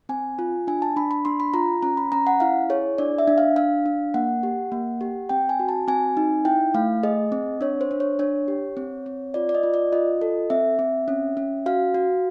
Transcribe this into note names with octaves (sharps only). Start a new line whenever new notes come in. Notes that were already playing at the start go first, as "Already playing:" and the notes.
C4 G#5
F4
D4 G#5
A5
D4 B5
B5
D4 C6
B5
F4 A#5
C#4 A#5
B5
C#4 A#5
F#5
E4 F5
G#4 C#5
D4 D5
E5
D4
F5
D4 F5
D4
A#3 F#5
G4
A#3
G4
C4 G5
G#5
F#4
A5
C4 G#5
D#4
E4 G5
A3 F5
G#4 D#5
C4
D4 C#5
C5
D4
C#5
D4 C#5
G4
C4
C4
F4 D5
D5
D#5
F4
D5
F4 D#5
A4
C4 E5
C4
C#4
C#4
F#4 F5
F#4